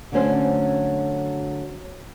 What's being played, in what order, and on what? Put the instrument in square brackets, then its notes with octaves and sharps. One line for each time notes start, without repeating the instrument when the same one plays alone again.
[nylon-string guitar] D3 F#3 A3 C#4 C5